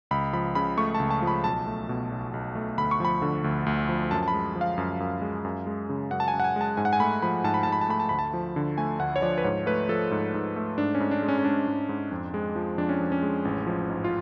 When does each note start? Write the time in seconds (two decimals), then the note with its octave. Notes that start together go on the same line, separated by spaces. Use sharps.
0.11 C#2 B5
0.33 F3 B5
0.55 C#3 B5
0.77 A3 C#6
0.95 A5
1.00 C#2
1.10 A5
1.22 F3
1.27 B5
1.44 B1 A5
1.67 A3
1.89 B2
2.12 B1
2.34 B1
2.55 A3
2.78 D2 B5
2.91 C#6
3.00 F3 B5
3.22 D3
3.44 D2
3.66 D2
3.89 F3
4.11 F#2 A5
4.23 A5
4.28 B5
4.33 G#3
4.55 F3
4.61 F5
4.78 F#2
5.00 F#2
5.22 G#3
5.45 F#2
5.67 G#3
5.89 C#3
6.11 F#2 F#5
6.20 A5
6.28 G#5
6.34 F#2
6.40 F#5
6.44 G#5
6.56 G#3 A5
6.77 G#2 G#5
6.85 F#5
6.93 G#5
7.00 A3 B5
7.22 F3 B5
7.44 G#2 A5
7.54 B5
7.63 G#2 A5
7.72 B5
7.81 A5
7.89 A3 B5
8.00 A5
8.09 D2 B5
8.19 A5
8.34 F3
8.56 D3
8.78 A3 G#5
9.00 D2 F#5
9.16 C#5
9.22 F3 D5
9.38 B4
9.44 G#2 C#5
9.66 A3 B4
9.89 F3 A4
10.11 G#2
10.34 G#2
10.56 A3
10.78 G#2 D4
10.95 C#4
11.00 G#2
11.11 D4
11.22 G#3
11.28 C#4
11.39 C#4
11.44 G#3 D4
11.67 G#2
11.89 G#2
12.11 F2
12.34 G#3
12.56 F3
12.78 F2 D4
12.89 C#4
13.00 F2
13.12 C#4
13.22 G#3
13.45 A1
13.66 F3
13.90 G#2
14.04 F4